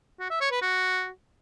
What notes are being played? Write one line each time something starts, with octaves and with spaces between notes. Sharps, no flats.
F#4
E5
C#5
B4
F#4